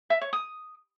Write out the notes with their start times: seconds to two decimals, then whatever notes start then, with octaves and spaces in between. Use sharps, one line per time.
0.10 E5
0.22 C#5
0.33 D#6